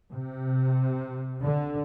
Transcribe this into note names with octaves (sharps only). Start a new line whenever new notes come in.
C3
D3